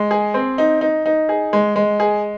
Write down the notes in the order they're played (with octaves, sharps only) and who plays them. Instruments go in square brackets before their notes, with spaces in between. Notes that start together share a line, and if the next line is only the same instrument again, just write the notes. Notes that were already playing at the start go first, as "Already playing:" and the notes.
Already playing: [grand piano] G#3
G#4
C4
D#4
D#4
D#4
G#4
G#3
G#3
G#4